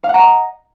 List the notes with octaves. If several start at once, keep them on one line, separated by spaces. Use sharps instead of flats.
D#5 F5 F#5 A#5